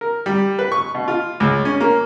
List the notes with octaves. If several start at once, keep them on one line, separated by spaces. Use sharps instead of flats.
A#4
G3
B4
C#6
B2
F4
C#2
C#4
A#3